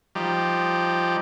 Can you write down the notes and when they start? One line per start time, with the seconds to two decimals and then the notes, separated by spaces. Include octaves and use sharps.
0.15 F3 G3 D#4 G4